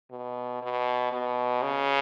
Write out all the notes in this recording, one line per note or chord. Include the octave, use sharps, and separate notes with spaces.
B2
B2
B2
C#3